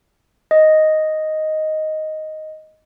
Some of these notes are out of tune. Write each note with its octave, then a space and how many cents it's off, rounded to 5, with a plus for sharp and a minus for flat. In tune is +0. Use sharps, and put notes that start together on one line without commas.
D#5 +5